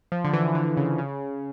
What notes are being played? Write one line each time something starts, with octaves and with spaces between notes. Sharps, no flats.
F3
D3
E3
D3
C#3
C#3